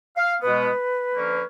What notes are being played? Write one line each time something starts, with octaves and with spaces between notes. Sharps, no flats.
F5
B2 G#3 B3 B4
D3 F3 A#3 C#4